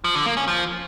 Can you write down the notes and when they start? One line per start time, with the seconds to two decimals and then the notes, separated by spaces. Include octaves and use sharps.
0.04 F3
0.15 D3
0.26 A#3
0.37 C#4
0.48 F3